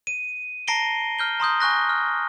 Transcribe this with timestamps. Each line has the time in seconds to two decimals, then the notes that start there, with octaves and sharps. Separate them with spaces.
0.07 D#7
0.68 A5 A#5 A#6 C7 D7 G7
1.19 F6 G6 G7
1.40 A#5 C6 D#6 G6
1.60 G#5 C#6 F#6 A#6
1.89 F6